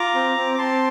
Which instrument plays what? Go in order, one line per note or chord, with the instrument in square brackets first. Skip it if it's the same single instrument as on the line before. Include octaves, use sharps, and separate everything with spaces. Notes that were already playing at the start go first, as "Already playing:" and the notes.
Already playing: [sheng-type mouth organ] F4 A#5 D6
C4
C4
D6
C4 A5 C6